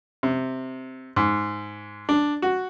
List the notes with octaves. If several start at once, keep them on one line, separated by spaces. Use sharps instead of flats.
C3
G#2
D4
F#4